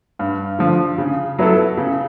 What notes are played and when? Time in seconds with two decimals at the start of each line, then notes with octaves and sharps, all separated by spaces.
0.19 G2
0.59 D3 F3
0.98 C#3
1.38 F#3 B3 E4 A4
1.77 C#3